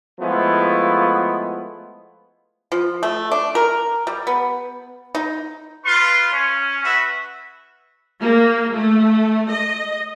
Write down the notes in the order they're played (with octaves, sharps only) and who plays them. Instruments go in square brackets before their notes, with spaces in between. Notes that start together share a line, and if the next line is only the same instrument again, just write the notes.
[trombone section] F3 G#3 A3 B3 E4 F4
[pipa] F3
A3
D4
A#4
G3
B3
D#4
[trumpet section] F4 B4 C6
C#4
F#4 B4 E5
[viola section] A#3
A3
D#5